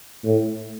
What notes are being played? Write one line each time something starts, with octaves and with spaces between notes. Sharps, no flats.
A2